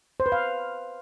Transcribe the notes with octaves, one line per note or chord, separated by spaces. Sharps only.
C5
B4
F5